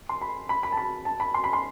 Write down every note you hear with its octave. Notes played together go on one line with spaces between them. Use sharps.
C6
B5
B5
B5
A5
B5
A5
B5
C6
B5
C6